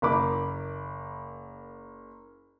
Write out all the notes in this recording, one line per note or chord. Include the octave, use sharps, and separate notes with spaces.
F#1 A#4 B5 D6